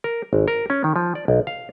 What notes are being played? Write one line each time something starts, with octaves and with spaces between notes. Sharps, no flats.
A#4
G#1
A#4
C#4
D#3
F3
D5
B1
F5